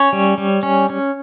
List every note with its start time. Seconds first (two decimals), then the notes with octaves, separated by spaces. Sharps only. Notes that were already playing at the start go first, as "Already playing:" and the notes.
Already playing: C#4 C#5
0.13 G3
0.38 G3
0.63 C#4
0.90 C#4